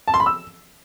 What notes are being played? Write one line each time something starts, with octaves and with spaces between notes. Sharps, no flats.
A5
C6
B5
E6